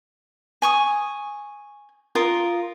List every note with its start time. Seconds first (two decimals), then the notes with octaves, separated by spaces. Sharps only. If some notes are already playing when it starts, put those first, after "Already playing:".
0.62 G#5 C#6 D#6
2.15 F4 A#4 D#6